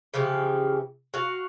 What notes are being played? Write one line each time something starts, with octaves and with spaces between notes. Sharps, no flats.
C#3 E3 F3 G4
F#4 F5